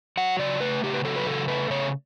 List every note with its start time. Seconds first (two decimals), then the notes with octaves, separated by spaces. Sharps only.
0.17 F#3 F#5
0.39 C#3 D5
0.60 A3 B4
0.83 C#3 G4
0.94 B4
1.04 F#3 A4
1.16 B4
1.27 C#3 A4
1.48 A3 B4
1.70 C#3 C#5